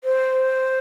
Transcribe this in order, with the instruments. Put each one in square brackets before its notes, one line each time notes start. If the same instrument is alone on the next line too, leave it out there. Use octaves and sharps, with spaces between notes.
[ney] C5